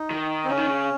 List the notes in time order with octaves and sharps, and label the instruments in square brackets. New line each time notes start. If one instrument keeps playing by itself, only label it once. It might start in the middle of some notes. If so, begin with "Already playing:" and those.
Already playing: [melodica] D#4
[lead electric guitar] D#3
[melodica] C4
[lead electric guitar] C#3 [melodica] C#4
[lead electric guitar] D#3
C#3